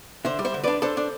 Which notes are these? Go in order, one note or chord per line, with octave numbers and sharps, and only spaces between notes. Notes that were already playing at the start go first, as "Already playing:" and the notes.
D3 C5 E5
G3
C5 E5
D3
D4 B4 D5
D4 A4 C5
D4